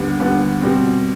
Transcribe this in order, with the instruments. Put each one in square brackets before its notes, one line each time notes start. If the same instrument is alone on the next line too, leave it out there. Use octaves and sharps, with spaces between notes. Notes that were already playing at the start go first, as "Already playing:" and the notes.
Already playing: [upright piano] D#2 D3 G3 B3
D#2 D3 G3 B3
B2 G3 C4